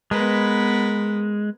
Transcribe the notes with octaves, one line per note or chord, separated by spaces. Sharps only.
G#3 B3 A#4 B4